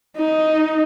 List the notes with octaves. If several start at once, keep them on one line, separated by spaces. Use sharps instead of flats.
D#4